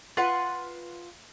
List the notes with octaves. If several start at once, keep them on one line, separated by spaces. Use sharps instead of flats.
F4 B4 F5 F#5